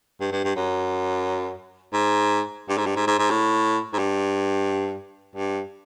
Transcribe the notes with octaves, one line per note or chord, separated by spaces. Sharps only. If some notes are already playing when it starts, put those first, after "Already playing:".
G2
G2
G2
F#2
G#2
G2
G#2
G2
G#2
G#2
G#2
A2
G#2
G2
G2